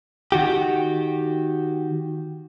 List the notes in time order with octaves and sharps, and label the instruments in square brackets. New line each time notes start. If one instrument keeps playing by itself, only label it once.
[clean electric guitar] D#3 F#4 G4